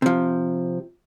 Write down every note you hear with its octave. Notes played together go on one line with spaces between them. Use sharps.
C3 F3